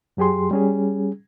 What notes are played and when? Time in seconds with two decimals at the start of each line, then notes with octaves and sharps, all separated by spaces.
0.17 F#2 F#3 G4 G#4 C6
0.51 G3 C#4 G#4